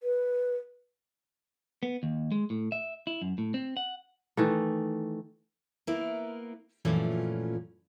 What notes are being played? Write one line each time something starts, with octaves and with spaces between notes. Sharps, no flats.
B4
B3
D#2
G#3
A2
E5
E4
F#2
A2
C4
F#5
D#3 E3 A3
A#3 B3 E4 A#4
F#2 A#2 E3 F3 A3 C#4